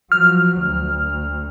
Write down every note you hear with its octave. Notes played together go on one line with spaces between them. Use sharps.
F3 F#3 F6
D2